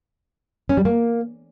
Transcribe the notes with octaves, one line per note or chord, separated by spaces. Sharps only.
C#4
G3
A#3